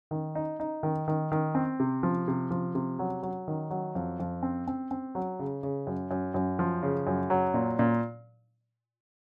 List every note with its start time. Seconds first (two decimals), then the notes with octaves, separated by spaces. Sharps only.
0.11 D#3
0.35 D#4
0.60 D#4
0.83 D#3
1.08 D#3
1.32 D#3
1.55 C4
1.80 C3
2.03 F3
2.28 C3
2.51 F3
2.75 C3
2.99 F#3
3.23 F#3
3.48 D#3
3.70 F#3
3.95 F2
4.20 F2
4.43 C4
4.68 C4
4.91 C4
5.15 F#3
5.39 C#3
5.63 C#3
5.87 F#2
6.11 F#2
6.34 F#2
6.59 F3
6.82 C#3
7.07 F#2
7.30 F#3
7.54 A#2
7.79 A#2